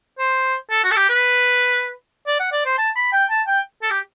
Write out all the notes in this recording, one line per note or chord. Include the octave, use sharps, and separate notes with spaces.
C5
A4
F#4
A4
G4
B4
D5
F#5
D5
C5
A5
B5
G5
A5
G5
A4
G4